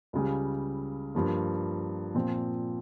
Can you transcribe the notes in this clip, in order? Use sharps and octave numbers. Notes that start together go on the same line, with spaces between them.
C#2 C#3 G3
G2 F3 A#3
A#2 F3 C4